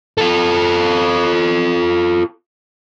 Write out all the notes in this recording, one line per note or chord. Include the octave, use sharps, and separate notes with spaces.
F4 A4